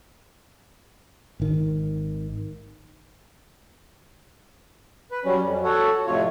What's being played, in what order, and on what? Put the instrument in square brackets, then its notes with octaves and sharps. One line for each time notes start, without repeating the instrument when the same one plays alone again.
[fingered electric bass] G#1 D#3
[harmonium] B4
F#3 G3 C#4
F2
F#4 A4 C#5 F#5
F2 A2 C3 F4 C#5